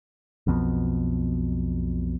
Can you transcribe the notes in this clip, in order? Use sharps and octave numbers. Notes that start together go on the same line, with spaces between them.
B1 F2 B2